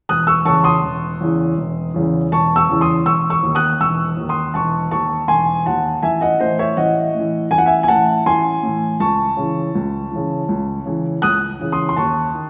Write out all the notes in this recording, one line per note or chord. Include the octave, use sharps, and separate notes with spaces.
E1 D#6 F#6
C#6 E6
E2 C#3 E3 A5 C#6
C6 D#6
E1
E2 C#3 E3
E1
E2 C#3 E3
E1 A5 C#6
C#6 E6
E2 C#3 E3
C6 D#6
E1 C#6 E6
C#6 E6
D#2 D#3
D#6 F#6
E1 C#6 E6
D#2 D#3
C6 D#6
E1 A5 C#6
D#2 D#3 A5 C#6
E1 G#5 C6
D#2 D#3 F#5 A5
A1 E5 G#5
D#5 F#5
A2 E3 C5 D#5
C#5 E5
A1 D#5 F#5
A2
E3
A1 G#5
F#5
E5 G#5
G#5
A2 E3 F#5 A5
A1 G#5 C6
A2 E3
C#2 A5 C#6
C#3 E3
C#2
C#3 E3
C#2
C#3 E3
C#2 D#6 F#6
C#3 E3
C6 D#6
C6
D#2 A5 C#6
D#3